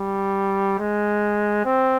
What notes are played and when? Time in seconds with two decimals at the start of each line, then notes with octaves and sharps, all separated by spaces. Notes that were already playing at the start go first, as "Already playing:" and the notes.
Already playing: G3
0.79 G#3
1.65 C4